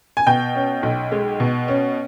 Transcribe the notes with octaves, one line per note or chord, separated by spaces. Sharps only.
G#5
B2 G5
C#4
B1
G#3
B2
C#4